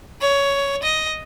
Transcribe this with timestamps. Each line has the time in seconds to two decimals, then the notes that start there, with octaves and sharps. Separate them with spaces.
0.21 C#5
0.83 D#5